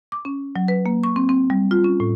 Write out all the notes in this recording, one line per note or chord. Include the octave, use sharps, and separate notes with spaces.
D6
C#4
F#3
B4
A#3
C#6
C4
C4
G3
F4
C#4
A2